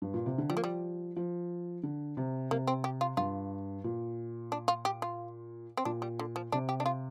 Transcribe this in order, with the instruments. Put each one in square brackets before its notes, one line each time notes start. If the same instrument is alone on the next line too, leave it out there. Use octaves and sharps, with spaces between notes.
[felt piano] G2
A#2
C3
D3
[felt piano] F3 [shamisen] G3
[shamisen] A#3
G3
[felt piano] F3
D3
C3
[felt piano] C3 [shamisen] A#3
[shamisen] C4
G4
F4
[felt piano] G2 [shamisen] F4
[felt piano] A#2
[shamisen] D4
F4
G4
F4
C4
[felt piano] A#2 [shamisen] D4
[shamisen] G3
D3
F3
[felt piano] C3 [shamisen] D4
[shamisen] G4
D4
F4